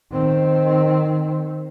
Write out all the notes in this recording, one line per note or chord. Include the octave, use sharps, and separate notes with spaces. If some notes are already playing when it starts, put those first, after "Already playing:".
D#3 C4